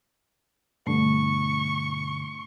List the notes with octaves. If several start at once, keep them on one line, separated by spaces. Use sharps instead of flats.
G2 B2 D3 A3 C#6